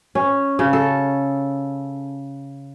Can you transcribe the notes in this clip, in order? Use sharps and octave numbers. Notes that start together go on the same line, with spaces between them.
C#4
C#3
A4